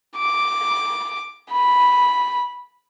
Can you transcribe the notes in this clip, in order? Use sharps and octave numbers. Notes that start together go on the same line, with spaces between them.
D6
B5